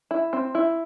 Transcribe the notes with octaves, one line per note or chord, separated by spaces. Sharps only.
E4
C4
E4